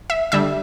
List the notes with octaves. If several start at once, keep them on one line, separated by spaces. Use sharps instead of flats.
E5
D3 G3 E5